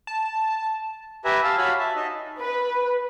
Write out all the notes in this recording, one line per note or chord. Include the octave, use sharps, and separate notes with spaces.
A5
G4 B4 E5 G#5 A#5
F5 A5 E6
F#4 C#5 F5 G#5 B5
E5 A5
D#4 D#5
B4